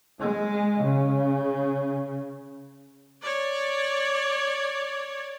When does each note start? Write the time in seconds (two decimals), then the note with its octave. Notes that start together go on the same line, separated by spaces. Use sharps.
0.20 G#3
0.81 C#3
3.22 C#5 D5